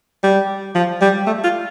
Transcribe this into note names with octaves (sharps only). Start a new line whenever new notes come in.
G3
F3
G3
A3
F4